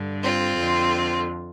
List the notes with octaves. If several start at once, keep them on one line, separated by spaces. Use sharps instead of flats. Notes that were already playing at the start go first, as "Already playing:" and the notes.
Already playing: G2 D3
C4 F4
F2 D3